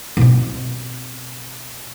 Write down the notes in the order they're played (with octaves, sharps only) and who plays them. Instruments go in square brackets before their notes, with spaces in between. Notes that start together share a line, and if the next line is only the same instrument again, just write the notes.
[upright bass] B2 C4